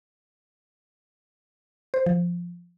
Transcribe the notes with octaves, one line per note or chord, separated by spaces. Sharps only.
C5
F3